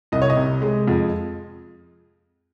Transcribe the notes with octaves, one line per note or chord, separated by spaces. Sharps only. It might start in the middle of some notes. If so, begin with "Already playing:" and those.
C2 D#5
C#5
D#5
C3
G#3
F2